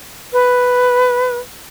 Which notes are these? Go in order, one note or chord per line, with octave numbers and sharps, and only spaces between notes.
B4